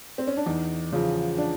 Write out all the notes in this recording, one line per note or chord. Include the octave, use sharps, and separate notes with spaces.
C4
C#4
D4
E2 D#4
C#3 F3
D4